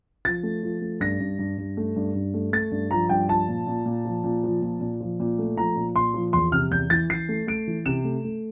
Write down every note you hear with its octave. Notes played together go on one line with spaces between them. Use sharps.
F3 A6
A3
F3
A3
G2 A#6
G2
G2
G2
A3
G2
G2
A3
A3 A6
G2
F3 A#5
G2 G5
F3 A5
A#2
A#2
A#2
F3
A#2
F3
A#2
A#2
F3
A#2
A3
F3 A#5
A#2
A#2 C6
F3
E2 C6
C3 F6
E2 G6
E3 A6
E3 C7
A3
A3 D7
E3
C3 E7
A3
A3